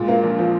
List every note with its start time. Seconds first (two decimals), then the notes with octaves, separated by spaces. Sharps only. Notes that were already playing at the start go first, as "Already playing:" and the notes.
Already playing: A#2 G#3
0.08 A#3
0.23 A#1
0.39 F3